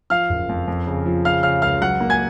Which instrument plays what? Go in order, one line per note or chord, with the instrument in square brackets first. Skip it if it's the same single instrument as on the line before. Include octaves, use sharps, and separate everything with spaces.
[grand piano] F3 F5 F6
F#1
F2
F2
C#3
F3
C#3 F5 F6
C#3 F5 F6
C#2 F5 F6
F#3 F#5 F#6
A#3
G#5 G#6